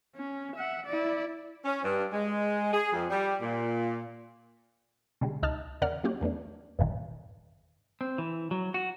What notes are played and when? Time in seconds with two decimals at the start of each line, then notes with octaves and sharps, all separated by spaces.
0.16 C#4
0.56 E5 F#5
0.86 E4 D5
1.65 C#4
1.84 G2
2.12 G#3
2.73 G#4
2.92 F2
3.10 G3
3.42 A#2
5.21 B2 D3 G3 G#3
5.43 C#2 D#4 A5 F6
5.81 E2 C#3 A#4 D5 F#5 F6
6.04 F#3 A#3 C#4 G4
6.21 E2 A3 B3 D4
6.79 G1 E2 G2 A#2 D#3
8.01 C4
8.18 E3
8.51 F#3
8.74 F#4